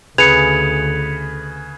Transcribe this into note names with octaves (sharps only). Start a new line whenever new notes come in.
D2 C#3 G#4 B4 G#6 C#7 F7